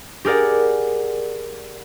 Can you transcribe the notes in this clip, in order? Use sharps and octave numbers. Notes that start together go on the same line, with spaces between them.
G4 G#4 A#4 D5 F#5